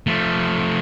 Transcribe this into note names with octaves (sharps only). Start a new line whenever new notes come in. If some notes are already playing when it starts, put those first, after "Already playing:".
F3 A3